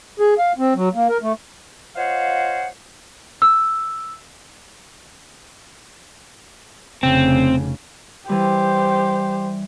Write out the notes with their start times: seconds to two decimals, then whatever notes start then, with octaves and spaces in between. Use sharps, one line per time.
0.20 G#4
0.39 F5
0.58 C4
0.75 F#3
0.94 A#3
1.09 A#4
1.22 A3
1.96 F4 C5 C#5 D#5 F5 F#5
3.42 E6
7.03 F1 C#3 C4
8.29 E3 G3 G4 C5